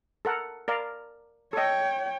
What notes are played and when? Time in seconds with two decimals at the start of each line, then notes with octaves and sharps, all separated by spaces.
0.25 A4 A#4 F#5
0.68 A#4 D5 F5
1.53 A4 C#5 D#5 G5